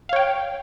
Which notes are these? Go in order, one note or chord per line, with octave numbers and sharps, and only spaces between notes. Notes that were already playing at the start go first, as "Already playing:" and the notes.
C#5 F5 G5